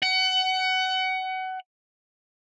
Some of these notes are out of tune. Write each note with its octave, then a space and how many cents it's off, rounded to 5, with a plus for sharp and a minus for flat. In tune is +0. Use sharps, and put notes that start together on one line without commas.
F#5 +25